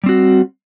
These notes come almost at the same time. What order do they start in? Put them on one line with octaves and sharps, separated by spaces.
G3 C4 F#4